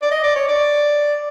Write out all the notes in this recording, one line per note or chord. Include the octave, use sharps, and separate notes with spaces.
D5
D#5
D5
C#5
D5